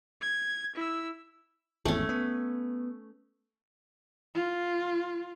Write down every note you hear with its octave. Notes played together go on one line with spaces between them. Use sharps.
G#6
E4 E6
G#1 E2 A3 C#4
B3
F4